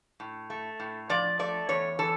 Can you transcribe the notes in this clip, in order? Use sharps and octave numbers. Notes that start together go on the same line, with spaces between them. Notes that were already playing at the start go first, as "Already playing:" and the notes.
A2
A3
A2
F3 D5
A3 D5
E2 C#5
E3 A4